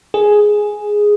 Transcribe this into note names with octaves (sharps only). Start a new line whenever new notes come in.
G#4